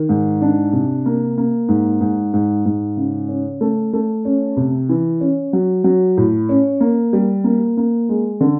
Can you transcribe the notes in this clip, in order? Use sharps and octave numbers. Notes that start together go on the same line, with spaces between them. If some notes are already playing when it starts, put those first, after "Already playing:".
Already playing: D#3
G#2
D4
C3
A#3
A#3
G#2
G#2
G#2
G#2
C#3
C#4
A3
A3
C#4
C3
E3
C#4
F#3
F#3
A2
C#4
A#3
G3
A#3
A#3
G#3
D3